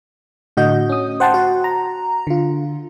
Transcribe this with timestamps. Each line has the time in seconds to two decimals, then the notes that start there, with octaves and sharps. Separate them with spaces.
0.57 A2 D3 F#4 D#5 G6
0.89 C#4 D#6
1.20 C5 F#5 G5 A5 C6
1.34 F#4 F#5
1.64 A#5
2.27 D3 F4